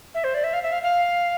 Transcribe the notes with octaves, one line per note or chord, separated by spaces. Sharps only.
E5
C5
D5
E5
F5
E5
F5
F5